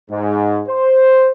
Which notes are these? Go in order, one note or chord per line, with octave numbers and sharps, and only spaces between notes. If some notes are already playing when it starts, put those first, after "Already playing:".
G#2
C5